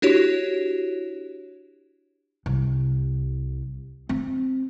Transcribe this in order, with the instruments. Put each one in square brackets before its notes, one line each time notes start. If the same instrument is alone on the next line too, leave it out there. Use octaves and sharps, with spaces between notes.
[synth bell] D4 E4 F#4 G4 C#5
[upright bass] C2
C4